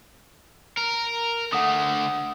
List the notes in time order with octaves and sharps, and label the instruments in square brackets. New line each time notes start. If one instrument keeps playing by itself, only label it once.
[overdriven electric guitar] A#4
[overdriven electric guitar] D3 A3 [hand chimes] F#5 D#6